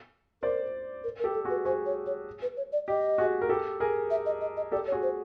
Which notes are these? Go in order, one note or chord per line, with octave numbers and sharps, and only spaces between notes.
A#4 C5 D5
A#4
A#4
G4 A4
A4
F#4 G#4
B4
F#4 G#4 C5
C#5
C#5
B4
C#5
D5
G4 D#5
F#4 G#4
A#4
G4 A4
G#4 A#4
E5
D#5
D#5
D#5
G4 A4 D5
C#5
F#4 G#4
C5